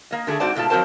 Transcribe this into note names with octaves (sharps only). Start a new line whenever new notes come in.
A#3 D#5
D3 A3 G#4
G#2 C4 F#4 C5 D5 A5
G#2 B2 A3 F4 A5
F2 F#3 C4 A#4 C5 A5